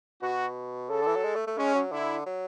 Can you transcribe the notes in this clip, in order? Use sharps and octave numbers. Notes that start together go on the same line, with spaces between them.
B2 F#4
C#3 A4
D3
E3
F#3
G#3
A3
A3
G#3 C#4
F#3
D3 E4
F#3